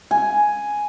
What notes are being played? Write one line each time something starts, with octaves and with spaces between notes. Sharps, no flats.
G#5